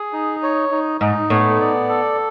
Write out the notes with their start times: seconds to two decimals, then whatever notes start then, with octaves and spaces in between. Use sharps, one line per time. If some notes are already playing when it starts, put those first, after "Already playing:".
Already playing: G#4
0.13 D#4
0.43 C#5
0.71 D#4
1.01 G#2 D#4
1.30 A2 B3
1.60 D5
1.89 A4